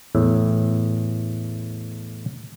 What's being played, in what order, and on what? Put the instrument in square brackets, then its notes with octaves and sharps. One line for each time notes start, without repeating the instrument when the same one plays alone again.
[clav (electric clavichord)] E2 A2 E5